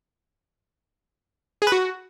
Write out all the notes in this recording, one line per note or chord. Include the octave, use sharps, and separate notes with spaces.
G#4
B4
F#4